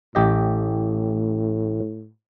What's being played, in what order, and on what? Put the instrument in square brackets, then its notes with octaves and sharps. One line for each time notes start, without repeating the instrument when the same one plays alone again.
[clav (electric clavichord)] A1 G4 D#5 [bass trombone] A2